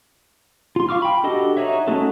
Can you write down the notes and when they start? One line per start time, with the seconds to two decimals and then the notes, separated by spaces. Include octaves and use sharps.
0.76 F4 C6
0.89 F5 C#6 D6 F6
1.02 G5 B5
1.24 D4 F#4 G4 A4 D#5
1.57 D#4 F#4 C#5 E5
1.87 A3 C#4 D#4 F#4 A4